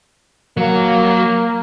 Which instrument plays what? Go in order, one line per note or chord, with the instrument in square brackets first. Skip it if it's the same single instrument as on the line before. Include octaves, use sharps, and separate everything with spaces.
[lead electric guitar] F#3 [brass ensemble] A#3